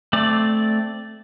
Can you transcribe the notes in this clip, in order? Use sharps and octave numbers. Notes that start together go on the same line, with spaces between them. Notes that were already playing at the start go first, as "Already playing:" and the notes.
A3 C4 D5